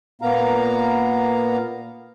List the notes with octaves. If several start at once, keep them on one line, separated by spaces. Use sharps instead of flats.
A#2 A#3 B3 F5 A#5